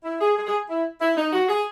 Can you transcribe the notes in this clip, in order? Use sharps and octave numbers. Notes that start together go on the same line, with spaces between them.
E4
G#4
G#4
G#4
E4
E4
D#4
F#4
G#4